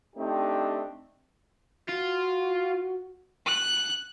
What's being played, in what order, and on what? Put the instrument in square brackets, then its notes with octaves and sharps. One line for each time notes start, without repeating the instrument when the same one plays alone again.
[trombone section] A3 C4 D4 D#4 G4
[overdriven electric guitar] F4 [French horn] F#4
[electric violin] F#6